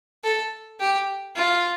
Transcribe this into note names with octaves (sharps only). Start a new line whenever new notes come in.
A4
G4
F4